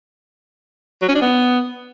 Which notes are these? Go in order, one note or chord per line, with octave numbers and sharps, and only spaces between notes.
F#3
C#4
D4
B3